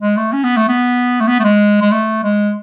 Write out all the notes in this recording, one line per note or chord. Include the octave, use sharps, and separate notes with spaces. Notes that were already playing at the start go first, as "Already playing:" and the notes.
G#3
A3
C#4
B3
A3
B3
A3
B3
A3
G#3
G#3
A3
G#3